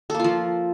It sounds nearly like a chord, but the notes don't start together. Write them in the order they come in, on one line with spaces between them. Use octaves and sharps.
A4 A#3 F4 F3